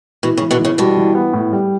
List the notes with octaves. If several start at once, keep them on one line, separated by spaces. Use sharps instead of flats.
B2 E3
C#3
E3
B2 D3
E3
C#3
B2 D3 G3
E3
B3
A2
G3